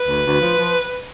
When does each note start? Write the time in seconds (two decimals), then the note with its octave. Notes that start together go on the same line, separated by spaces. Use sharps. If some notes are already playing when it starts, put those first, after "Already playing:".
Already playing: B4
0.08 D2
0.25 D2
0.41 F3
0.58 F3